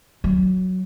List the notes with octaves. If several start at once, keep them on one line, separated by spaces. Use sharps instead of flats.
F#3